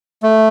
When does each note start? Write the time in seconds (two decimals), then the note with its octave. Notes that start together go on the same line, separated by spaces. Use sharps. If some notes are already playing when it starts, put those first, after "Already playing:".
0.23 A3